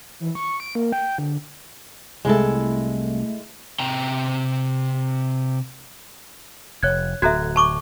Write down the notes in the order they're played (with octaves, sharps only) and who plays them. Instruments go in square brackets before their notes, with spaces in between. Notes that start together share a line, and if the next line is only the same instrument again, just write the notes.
[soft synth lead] E3
C#6
D7
A#3
G5
D3
[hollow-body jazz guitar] C2 [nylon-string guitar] G#3 E4 A4 [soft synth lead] A3
[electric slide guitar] C3 C4 G5 A#5
[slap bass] F1 [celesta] C#5 F#6 G#6
[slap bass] D1 [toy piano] F#4 A4 E5 [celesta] A#5 F#6 G#6
[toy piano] A5 C#6 D6